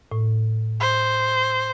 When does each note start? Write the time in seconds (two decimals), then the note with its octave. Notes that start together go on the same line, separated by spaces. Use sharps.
0.12 A2
0.80 C5